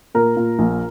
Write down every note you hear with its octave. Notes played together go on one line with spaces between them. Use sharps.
A#2 A#4
A#2
A#1